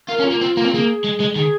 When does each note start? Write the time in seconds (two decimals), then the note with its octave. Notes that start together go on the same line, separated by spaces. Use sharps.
0.08 F4 A#4
0.19 C#4
0.25 F4
0.30 A#3
0.41 C4 F4
0.57 A#3 F4
0.65 C4
0.73 A#3 G#4
1.04 G#3
1.20 G#3
1.35 D#3 G#4